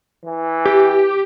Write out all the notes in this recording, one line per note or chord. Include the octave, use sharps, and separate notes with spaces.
E3
G4